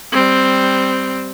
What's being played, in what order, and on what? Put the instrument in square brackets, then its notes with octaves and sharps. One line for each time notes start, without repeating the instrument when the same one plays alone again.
[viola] G3 C4